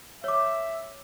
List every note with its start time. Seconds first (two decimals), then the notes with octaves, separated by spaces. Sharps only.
0.24 C#5 E5 D6